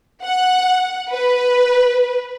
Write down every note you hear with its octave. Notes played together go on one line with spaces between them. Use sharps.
F#5
B4